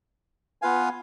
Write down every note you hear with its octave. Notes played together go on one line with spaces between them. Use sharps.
B3 F4 B4 F5 G#5